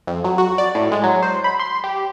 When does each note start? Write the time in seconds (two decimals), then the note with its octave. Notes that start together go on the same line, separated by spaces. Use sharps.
0.07 F2
0.24 F#3
0.38 F#4
0.58 D5
0.75 A2
0.92 G#3
1.04 F#3
1.23 C5
1.44 B5
1.59 C6
1.84 G4